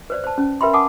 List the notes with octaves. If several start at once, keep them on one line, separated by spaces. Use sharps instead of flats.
B4 C5 D5
C5 A5
C#4
A#4 B4 E5 G5 B5 C6
F#5 G#5 A5 D6 D#6